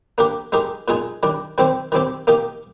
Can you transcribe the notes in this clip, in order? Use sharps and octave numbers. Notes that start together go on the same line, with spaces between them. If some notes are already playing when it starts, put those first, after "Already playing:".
A#3 D4 G4 A#4
G#3 D#4 G4 A#4
A#2 G#3 D#4 G#4
D#3 G3 D4
D#3 G3 C4 G4 C5
D#3 G3 C4 G4
A#3 D#4 G4 A#4